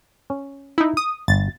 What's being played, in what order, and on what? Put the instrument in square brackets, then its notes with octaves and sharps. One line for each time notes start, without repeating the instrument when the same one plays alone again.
[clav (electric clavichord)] C#4
[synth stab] D#4 E4
D#6
[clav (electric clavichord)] G1 [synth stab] A6